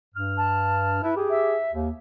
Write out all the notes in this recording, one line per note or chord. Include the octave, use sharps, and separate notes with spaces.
G2 F6
A5
E4 B4
G4 G#4
E5
D#2